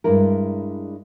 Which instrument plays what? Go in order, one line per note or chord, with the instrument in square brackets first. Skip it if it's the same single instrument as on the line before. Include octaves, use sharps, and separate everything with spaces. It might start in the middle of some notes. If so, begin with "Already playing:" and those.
[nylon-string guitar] G2 G#3 D4 E4 A#4